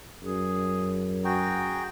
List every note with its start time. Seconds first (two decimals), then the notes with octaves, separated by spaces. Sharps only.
0.24 F#2 G#4
1.25 F#4 G#4 G5 A#5